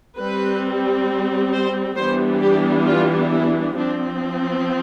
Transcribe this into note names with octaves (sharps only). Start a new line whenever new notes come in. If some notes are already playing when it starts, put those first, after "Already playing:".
G3 C4 B4
C5
E3 G3 B3 D4 C5
G4
F4
E4
F3 C4 D4